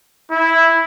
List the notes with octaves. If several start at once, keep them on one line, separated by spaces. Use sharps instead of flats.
E4